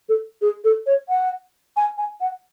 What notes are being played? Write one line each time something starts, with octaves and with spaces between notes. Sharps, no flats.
A4
G#4
A4
C#5
F#5
G#5
G#5
F#5